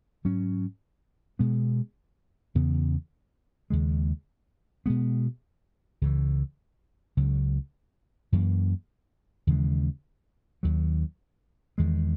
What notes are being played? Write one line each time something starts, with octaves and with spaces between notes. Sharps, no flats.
G#2 F#3 C#4
B2 G#3 B3
E2 C#3 E3 B3
D#2 C#3 G#3
B2 G#3 B3
C#2 C#3 E3
C#2 C#3 F#3
F#2 E3 A#3
D#2 C#3 E3 G#3
D#2 D#3 F#3
E2 D#3 G#3